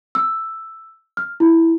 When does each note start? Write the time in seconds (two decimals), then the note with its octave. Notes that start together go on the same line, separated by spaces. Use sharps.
0.15 E6
1.17 F6
1.40 E4